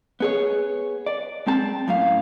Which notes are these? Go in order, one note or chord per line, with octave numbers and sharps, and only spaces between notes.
B3 G#4 C#5
D5
G#3 C4 A5
F#2 A2 F5